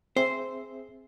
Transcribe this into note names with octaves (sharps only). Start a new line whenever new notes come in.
C4 G#4 C5 E5